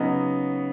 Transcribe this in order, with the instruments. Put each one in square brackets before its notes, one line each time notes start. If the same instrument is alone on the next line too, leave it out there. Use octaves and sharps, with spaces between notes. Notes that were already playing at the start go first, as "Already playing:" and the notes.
Already playing: [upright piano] C#3 F#3 B3 D#4